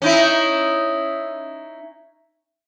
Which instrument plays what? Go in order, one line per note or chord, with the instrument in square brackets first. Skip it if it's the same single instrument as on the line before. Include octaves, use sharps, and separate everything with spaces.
[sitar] C#4 D#4 E4